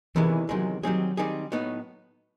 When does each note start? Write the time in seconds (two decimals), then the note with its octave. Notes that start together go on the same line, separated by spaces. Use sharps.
0.15 E2 C3 D#3 E3 G#3
0.49 E2 C3 D#3 F#3 G#3
0.83 D#3 F#3 G3 C4 D#4 G#4
1.17 D#3 G3 C4 D#4 G#4
1.52 A2 F#3 B3 D#4